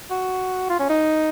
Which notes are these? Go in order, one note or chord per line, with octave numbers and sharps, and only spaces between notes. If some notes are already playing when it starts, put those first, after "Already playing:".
F#4
F4
C#4
D#4